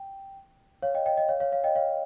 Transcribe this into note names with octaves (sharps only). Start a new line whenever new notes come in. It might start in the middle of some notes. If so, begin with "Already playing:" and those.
Already playing: G5
C#5 F5
D#5 G5
D#5 G5
D#5 G5
C#5 F5
C#5 F5
C#5 F5
D#5 G5
C#5 F5